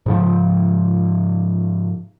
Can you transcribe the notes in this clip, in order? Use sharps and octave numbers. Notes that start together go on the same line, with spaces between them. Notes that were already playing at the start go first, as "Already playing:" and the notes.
G#2 C#3 F3